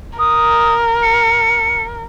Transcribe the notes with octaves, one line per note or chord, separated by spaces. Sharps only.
A#4 D#6
C#7